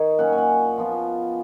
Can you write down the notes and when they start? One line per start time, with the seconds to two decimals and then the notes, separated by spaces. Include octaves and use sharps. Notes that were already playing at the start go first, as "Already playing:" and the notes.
Already playing: D#3 D#4 C#5 D#5
0.18 A#2 F#3 C#4 F#5
0.32 G#5
0.38 F#5
0.78 F3 B3 F4